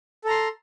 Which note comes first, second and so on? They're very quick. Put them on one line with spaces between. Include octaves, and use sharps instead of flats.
A4 A#5 C6